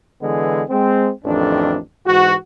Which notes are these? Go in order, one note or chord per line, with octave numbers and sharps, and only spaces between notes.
D3 E3 G#3 B3 G#4
G#3 C4
A1 F2 D#3 D4
G#2 E3 F#4